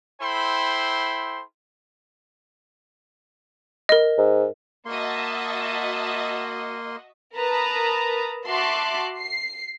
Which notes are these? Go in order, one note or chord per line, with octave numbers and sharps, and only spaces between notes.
E4 A4 C5 G5 B5 C6
A#4 D#5
G#2
A#3 F#4 D#5 E5 A5 C6
A#4 B4 A5 A#5 D#6
F#4 E5 A5 C6 D6 F#6
C7